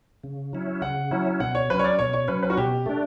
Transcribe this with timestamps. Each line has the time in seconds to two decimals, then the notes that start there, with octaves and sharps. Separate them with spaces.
0.24 C#3
0.53 F#3 C#4 E4
0.82 C#3 F#5
1.11 F#3 C#4 E4
1.40 B2 F#5
1.55 C#5
1.70 F#3 C#4 B4
1.79 C#5
1.84 D5
1.99 B2 C#5
2.13 C#5
2.28 F#3 C#4 B4
2.43 B4
2.50 F#4
2.57 B2 G4
2.86 A3 D4